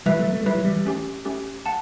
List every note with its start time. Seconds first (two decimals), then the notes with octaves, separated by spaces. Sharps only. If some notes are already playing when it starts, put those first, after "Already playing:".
0.06 E3 G3 E4 B4 E5
0.19 F#3 A3
0.33 A3
0.43 G3 E4 B4 E5
0.55 F#3
0.64 E3 G3
0.85 A3 C#4 G4
1.25 A3 C#4 G4
1.66 F#5 A5